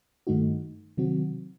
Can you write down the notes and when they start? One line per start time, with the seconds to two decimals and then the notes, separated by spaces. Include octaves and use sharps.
0.27 G2 D#3 A3 D#4 F#4
0.97 C3 D#3 F#3 C4 F#4